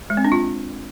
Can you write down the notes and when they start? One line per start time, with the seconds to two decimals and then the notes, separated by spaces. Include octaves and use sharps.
0.10 G#3
0.17 C4
0.24 D4
0.32 F4